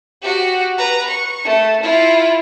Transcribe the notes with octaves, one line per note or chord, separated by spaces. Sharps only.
F#4 G4
B4 A#5
C#6
A3
E4 F4